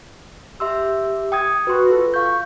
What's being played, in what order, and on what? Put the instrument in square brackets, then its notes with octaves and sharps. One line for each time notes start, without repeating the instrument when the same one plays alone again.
[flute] G4 [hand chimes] E5 C6 E6
[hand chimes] G5 D#6 G#6
[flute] F#4 [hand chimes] B4 C6
[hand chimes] F4 [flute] A4
[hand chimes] F5 G6 [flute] C#6